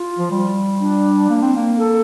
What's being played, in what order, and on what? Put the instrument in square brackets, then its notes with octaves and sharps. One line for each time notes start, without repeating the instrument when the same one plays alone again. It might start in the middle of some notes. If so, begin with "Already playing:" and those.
Already playing: [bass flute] F4
[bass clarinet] F3
G3
[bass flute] D4
[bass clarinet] A#3
C4
A#3
[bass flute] A4